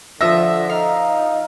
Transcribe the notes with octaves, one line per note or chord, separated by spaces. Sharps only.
D3 F3 E5 E6 A#6
D#4 F5